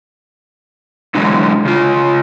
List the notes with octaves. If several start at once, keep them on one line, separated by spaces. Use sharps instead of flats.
B2 D3 E3 F#3 G#3
C#3 F4